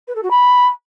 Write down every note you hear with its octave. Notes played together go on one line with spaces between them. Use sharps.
B4
A4
F#4
B5